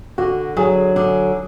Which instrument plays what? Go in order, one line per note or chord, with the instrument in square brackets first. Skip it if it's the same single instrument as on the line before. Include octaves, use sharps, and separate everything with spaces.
[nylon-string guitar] D3 [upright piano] F#4
[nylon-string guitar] F#3 [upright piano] G#4
[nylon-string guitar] D3